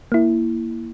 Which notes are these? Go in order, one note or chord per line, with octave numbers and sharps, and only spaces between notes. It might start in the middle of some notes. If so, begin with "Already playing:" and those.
A#3 E4